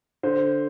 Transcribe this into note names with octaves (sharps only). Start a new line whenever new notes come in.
D3 C5